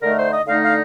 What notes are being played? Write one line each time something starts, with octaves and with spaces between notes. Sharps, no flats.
D3 A3 D#4 A#4
C5
D#5
D3 A3 D#4 F5
F5